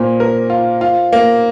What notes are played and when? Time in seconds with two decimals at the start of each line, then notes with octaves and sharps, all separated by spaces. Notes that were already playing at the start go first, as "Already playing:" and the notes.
Already playing: A#2 A#3 C5
0.20 A#4
0.50 F4
0.81 F4
1.13 A#3